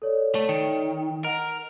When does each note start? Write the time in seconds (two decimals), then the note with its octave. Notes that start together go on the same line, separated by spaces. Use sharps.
0.02 A4 C#5 D5
0.35 A3
0.49 D#3
1.25 A#4 D#5 F#5